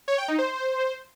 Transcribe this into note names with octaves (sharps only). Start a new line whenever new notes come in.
C#5
G5
D#4
C5